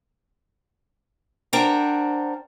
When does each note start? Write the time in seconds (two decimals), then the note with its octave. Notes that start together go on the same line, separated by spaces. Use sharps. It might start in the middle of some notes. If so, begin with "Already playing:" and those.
1.53 D4 A#4 C5 F#5 G5 A#5